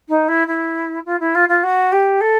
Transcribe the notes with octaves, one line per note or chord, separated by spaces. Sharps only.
D#4
E4
E4
F4
E4
F4
F4
F#4
G4
A4